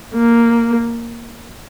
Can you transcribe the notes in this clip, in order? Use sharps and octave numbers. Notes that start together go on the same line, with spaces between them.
A#3